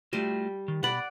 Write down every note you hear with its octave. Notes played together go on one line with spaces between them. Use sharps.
G3 A3 F4 F#4
D#3
B2 D5 F#5 B5